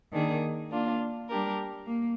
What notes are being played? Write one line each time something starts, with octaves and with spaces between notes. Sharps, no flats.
D#3 A#3 D4 G#4
A#3 D4 F4
G3 D4 G4 A#4
A#3